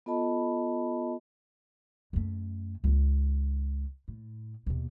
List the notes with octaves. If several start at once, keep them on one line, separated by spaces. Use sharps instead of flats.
B3 F4 A4 D#5 A5 B5
F#2 A3
C#2 D#3
A2
D#2 B2